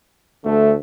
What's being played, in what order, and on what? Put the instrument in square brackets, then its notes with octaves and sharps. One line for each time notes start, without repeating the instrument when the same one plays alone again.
[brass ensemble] D2 D3 A3